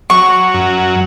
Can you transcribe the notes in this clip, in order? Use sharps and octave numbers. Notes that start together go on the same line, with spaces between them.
F#3 C#6
F#2